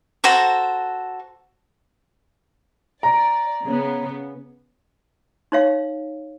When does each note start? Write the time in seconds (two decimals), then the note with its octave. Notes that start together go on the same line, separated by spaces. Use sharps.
0.24 F#4 A4 C5 A#5
3.03 D5 A#5
3.64 C#3 B3
5.52 D#4 C#5 F5